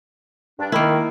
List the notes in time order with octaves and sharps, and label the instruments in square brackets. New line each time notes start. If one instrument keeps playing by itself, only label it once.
[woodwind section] G2 D4
[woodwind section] D#3 [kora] A#3 E4